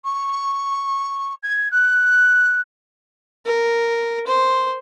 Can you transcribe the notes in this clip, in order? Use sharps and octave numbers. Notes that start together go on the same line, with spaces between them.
C#6
G#6
F#6
A#4
C5